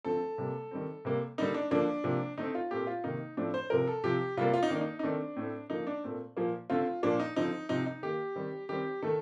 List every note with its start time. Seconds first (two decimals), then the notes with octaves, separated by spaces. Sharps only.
0.04 D3 F3 A3 C4 A4
0.38 C3 G3 A#3
0.71 D#3 G3 C4
1.05 C3 G3 A#3
1.38 D3 G3 A#3 D#4
1.54 D4
1.71 D3 F3 A#3 D4
2.04 C3 F3 A#3
2.38 D3 A3 C4 D#4
2.55 F4
2.71 A#2 A3 C4 G4
2.87 F4
3.04 C3 D#3 A#3 D#4
3.37 A2 F3 A3 C4 D4
3.54 C5
3.70 C3 F3 C4 A#4
3.87 A4
4.04 C3 F3 C4 G4
4.37 C3 G3 A#3 F4
4.54 F4
4.63 D#4
4.70 D#3 A#3 D4
4.81 D#4
4.99 D#4
5.03 D#3 A3 C4 D4
5.36 A2 A3 C4
5.70 D3 F3 A#3 D#4
5.87 D4
6.04 A#2 A3 C4
6.37 A#2 F3 A#3
6.70 D3 A3 C4 F4
7.03 A#2 F3 A#3 D4
7.20 D#4
7.36 D3 F3 C4 D#4
7.69 C3 F3 C4 D#4
7.86 D#4
8.03 D#3 A#3 G4
8.36 D#3 G3 C4
8.69 D#3 G3 C4 G4
9.02 D#3 A3 A4